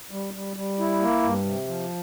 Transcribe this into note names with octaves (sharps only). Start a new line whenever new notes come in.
G3
G3
G3
E4
A#3
G2
C3
F3